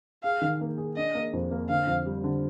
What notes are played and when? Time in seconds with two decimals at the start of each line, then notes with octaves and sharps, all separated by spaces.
0.24 G#4 F5
0.42 D#3
0.61 A#3
0.78 G#4
0.96 D4 D#5
1.15 A#3
1.33 F2
1.51 A#3
1.69 D3 F5
1.87 F2
2.06 G3
2.24 D3